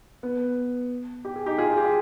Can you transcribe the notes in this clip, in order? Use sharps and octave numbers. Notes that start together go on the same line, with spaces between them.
B3
G4
G#4
D#4 G4
F4 G#4
G4
F4